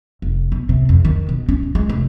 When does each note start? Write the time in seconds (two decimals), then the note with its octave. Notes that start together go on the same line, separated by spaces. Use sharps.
0.22 F1
0.52 B2
0.69 C3
0.89 F2
1.05 D#3
1.29 B2
1.49 C#4
1.63 D#4
1.75 G#3
1.89 F1